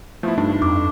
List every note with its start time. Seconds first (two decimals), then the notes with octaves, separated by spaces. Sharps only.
0.23 F3 A3 B3 E4
0.38 G2 D4 D#4
0.62 F2 D6